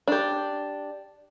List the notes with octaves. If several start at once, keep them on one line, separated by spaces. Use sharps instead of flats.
D4 G4